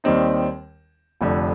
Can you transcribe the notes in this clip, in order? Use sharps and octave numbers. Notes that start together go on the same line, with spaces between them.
D#2 D#3 G3 C4 D#4
F1 F2 D3